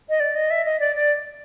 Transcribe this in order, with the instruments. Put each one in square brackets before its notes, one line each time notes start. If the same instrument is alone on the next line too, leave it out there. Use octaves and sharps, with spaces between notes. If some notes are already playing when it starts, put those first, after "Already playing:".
[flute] D#5
D5
D#5
E5
D#5
D5
D5